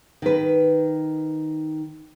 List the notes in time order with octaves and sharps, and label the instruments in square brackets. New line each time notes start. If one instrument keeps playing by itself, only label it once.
[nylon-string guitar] D#3 B4